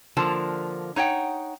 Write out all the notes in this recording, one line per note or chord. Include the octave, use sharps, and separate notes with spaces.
D3 F3 A#3 A5
D#4 C#5 F#5 G5